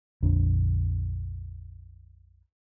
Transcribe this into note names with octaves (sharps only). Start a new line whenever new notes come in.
A#1 F2 D3